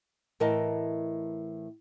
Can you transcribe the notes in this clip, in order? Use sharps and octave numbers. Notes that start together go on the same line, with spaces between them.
A2 E3 A#4 D#5 G5 A5